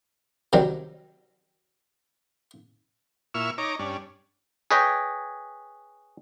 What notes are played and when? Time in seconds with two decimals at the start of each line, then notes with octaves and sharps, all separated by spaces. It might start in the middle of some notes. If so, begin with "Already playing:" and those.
0.53 C3 D#3 F#3 G3
3.34 A#2 E4 C#6 E6 F6
3.58 D#4 C#5 A#5 D6
3.79 G2 C#4 D4
4.71 G#4 B4 C#5 D#5 G5 G#5